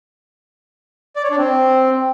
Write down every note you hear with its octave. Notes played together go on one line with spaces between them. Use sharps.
D5
C#5
D4
C4